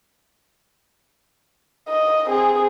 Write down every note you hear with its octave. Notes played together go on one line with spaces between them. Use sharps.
D#5
C4 G#4